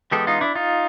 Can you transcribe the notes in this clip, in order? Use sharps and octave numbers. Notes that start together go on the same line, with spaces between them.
E3 G#3 B3 G4 A4
D#4 F4
D4 E4
D#4 F4